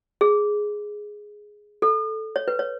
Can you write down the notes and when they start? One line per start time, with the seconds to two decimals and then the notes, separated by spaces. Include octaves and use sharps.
0.21 G#4
1.82 A4
2.36 C#5
2.48 B4
2.59 C#5